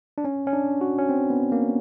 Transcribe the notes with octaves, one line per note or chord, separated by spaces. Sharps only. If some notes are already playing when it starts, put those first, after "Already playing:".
D4
C#4
C#4
D4
F#4
C#4
C4
B3
A#3